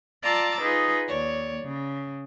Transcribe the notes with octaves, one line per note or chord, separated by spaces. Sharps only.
F4 D5 A5 A#5 D6 E6
D#4 F4 G#4 B4
D#2 C#5 D5
C#3